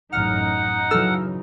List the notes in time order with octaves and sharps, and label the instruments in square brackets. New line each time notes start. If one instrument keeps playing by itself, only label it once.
[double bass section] A1 F#2 [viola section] D#4 [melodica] F#5 [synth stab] F6
[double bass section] C#3 E3 F#3 [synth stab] A4 E6 F6